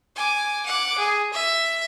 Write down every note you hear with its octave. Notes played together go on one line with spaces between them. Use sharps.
G#5 D6
F#5 D6
G#4
E5